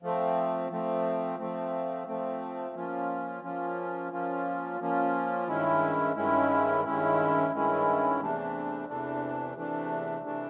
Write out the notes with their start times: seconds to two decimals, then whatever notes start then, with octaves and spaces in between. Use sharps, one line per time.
0.03 F3 A3 C4
0.70 F3 A3 C4
1.39 F3 A3 C4
2.07 F3 A3 C4
2.76 F3 A#3 C#4 F4
3.43 F3 A#3 C#4 F4
4.11 F3 A#3 C#4 F4
4.80 F3 A#3 C#4 F4
5.48 G2 D#3 G#3 C#4 E4
6.16 G2 D#3 G#3 C#4 E4
6.84 G2 D#3 G#3 C#4 E4
7.53 G2 D#3 G#3 C#4 E4
8.21 E2 C3 E3 A3 D4
8.89 E2 C3 E3 A3 D4
9.57 E2 C3 E3 A3 D4
10.25 C3 E3 A3 D4